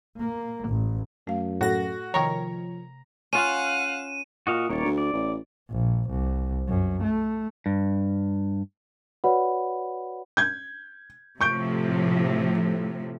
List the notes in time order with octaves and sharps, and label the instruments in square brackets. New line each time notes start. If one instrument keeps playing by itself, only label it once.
[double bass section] A#3
A1
[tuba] F#2 [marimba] A3 F5
[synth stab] A2 A#6 [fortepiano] F#4 [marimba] A4
[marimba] C3 G5 C#6 [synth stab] D#3 A#4 C#5 [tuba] F3 [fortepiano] A#5
[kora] C#4 F4 [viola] F5 F#5 [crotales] D#7 E7
[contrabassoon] A#2 [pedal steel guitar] F#4 D#5 F5
[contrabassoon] D#1 [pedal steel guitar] A#3 C#5 D5
[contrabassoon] D2
[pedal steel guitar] D5
[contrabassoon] A1
[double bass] A#1
C2
F#2
A3
[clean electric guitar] G2
[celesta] F#4 B4 C#5 D5 F#5 B5
[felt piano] G6 G#6
[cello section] A2 C3 F3 [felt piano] C#6 G6 D7